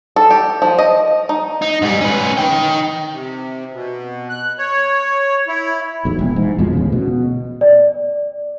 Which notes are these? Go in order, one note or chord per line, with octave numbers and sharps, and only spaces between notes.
A4
G4
F3
D#5
D#4
D#4
G#2 G3
C#4 B4
D#4 G5
C3
B2
F#6
C#5
E4
B1 E2
E1 A#1
G#2
F2 B2 F3 G#3
A1 D2 C#3
B2
D5